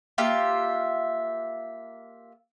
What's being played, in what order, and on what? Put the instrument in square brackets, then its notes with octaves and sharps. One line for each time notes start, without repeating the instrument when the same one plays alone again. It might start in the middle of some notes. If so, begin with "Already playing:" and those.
[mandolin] A#3 F4 G4 E5